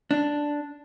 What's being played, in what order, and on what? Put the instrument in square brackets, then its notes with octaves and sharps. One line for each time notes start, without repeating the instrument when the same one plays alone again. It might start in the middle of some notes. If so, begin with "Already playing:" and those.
[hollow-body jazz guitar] D4